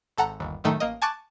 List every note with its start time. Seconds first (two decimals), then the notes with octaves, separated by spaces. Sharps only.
0.18 G#1 A4 F#5 A#5
0.40 G1 D#2
0.64 F#2 A2 D#3 A3 D#4
0.80 A1 A#3 D#5
1.02 G#5 A5 C#6 D6 F#6 A6